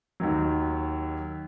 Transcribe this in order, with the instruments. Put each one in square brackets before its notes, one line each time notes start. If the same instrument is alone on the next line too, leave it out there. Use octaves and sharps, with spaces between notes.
[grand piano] D#2 D#3 F#3